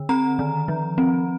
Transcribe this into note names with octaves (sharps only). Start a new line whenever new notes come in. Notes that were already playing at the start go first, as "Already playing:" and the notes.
Already playing: D3
C4 A#5
D#3
F3
C4